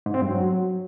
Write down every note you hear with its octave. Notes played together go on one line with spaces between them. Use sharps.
G#2
C4
G2
F#3